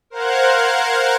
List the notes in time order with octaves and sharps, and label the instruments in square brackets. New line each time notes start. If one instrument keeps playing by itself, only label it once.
[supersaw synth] A#4 C5 F5 F#5 F#6 G#6